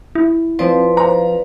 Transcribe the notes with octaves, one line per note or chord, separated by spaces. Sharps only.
E4
F3 C4 F4 B4 D5
A#5